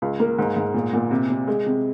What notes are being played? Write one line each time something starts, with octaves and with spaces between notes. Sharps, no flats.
C#2
A#3
G#2
G#2
A#2
A#2
C3
C3
G#3
C3